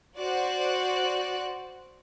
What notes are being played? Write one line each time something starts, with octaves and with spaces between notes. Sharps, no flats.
F#4 C5 D5 F#6